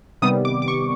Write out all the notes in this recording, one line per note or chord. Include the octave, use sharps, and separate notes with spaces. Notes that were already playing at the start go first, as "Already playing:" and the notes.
C3 D#3 G3 B3 D#6
D6
D6
C#6